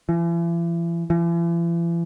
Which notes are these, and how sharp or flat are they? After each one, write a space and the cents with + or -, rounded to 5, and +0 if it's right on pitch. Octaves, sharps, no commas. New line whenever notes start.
E3 +40
E3 +45